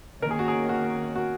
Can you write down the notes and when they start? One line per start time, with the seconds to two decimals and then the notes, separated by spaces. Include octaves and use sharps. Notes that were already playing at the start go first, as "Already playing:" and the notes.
0.22 D#3 A#3 C#4 A#4
0.31 G#4
0.39 F#4
0.48 G#4
0.69 F#4
1.16 F#4